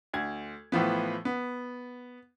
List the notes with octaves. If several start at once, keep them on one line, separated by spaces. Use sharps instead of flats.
D2 G#6
A2 E3 F3 B3
B3